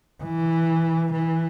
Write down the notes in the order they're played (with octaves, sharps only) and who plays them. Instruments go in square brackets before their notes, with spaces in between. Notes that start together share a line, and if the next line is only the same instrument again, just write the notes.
[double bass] E3
E3